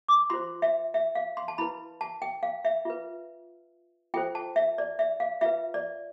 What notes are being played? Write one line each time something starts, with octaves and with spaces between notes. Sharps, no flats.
D6
F4 C5 C6
E5
E5
F5
C6
A5
E4 B4 B5
A5
G5
F5
E5
F4 B4
F4 A4 C5 G5
A5
E5
D5
E5
F5
F4 B4 E5
D5